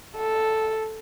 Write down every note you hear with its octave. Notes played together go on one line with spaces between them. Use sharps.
A4